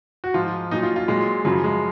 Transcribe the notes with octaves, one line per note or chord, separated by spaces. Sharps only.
F#4
G#2 F3 F4
A#2 F#3 D#4
F4
F4
A#2 F#3 G#3
F#2 C#3 F3 F#3
G#3